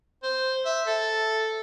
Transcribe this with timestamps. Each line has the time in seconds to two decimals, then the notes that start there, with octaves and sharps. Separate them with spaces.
0.23 C5
0.65 E5
0.87 A4